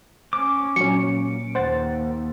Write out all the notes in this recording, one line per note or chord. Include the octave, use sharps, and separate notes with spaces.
C#4 D6
A#2 F#3 C#4 C#7
D#2 C5 F#5 A6